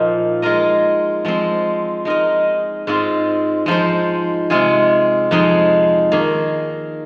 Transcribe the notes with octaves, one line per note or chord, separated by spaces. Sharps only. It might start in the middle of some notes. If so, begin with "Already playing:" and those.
Already playing: A#2 F3 A#3 D#4 C5
G#3 F4 A#4 D#5
F3 G#3 C4
G#3 D#4 A#4 D#5
G#2 G#3 C4 F4
F3 G#3 D#4 C5
C3 G#3 F4 G#4
F2 F3 G#3 D#4 G#4
D#3 A#3 G#4